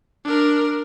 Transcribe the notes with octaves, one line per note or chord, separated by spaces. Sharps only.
D4 A#4